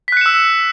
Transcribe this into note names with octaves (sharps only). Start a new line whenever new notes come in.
E6 F#6 B6 C#7 E7